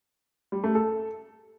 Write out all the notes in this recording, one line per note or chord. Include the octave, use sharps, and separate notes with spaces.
G3
A3
A4